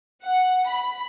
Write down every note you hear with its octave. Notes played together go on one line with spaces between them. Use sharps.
F#5
B5